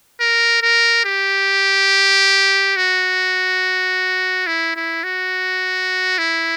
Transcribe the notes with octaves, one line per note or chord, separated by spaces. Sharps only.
A#4
A#4
G4
F#4
E4
E4
F#4
E4